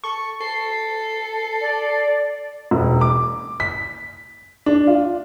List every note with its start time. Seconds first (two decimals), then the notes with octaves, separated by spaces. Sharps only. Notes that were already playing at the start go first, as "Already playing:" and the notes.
0.04 A4 C#6
0.41 A4 C7
1.61 D5
2.71 E1
3.01 D6
3.60 B6
4.66 D4
4.87 F4